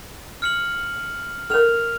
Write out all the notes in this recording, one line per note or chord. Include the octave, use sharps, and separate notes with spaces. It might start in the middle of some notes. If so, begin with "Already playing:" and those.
F6 C#7 F#7
A4 A#4 F6 F7